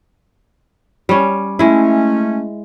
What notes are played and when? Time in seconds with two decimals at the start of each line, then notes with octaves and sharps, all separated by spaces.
1.09 G3 C#4
1.59 G#3 A3 C#4 E4